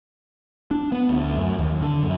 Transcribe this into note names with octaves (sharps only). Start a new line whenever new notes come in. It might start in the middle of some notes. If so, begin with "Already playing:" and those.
D4
B3
D2
F#2
D#2
D3
F#2